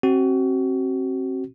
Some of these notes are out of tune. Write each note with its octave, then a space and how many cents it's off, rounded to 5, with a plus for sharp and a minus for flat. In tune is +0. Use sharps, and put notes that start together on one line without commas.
C4 +30 F#4 +30